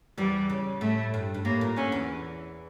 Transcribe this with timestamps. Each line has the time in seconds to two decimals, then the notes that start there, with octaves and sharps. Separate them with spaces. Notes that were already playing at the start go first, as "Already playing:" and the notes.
0.18 E2 E3 G3
0.50 C#3
0.81 A2 A3
1.14 G2
1.34 G2
1.45 A2 A#3
1.61 A#2
1.76 D2 D3 C#4
1.92 E2 E3